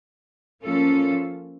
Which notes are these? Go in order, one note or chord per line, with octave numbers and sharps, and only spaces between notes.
F3 A#3 C#4 F4 A4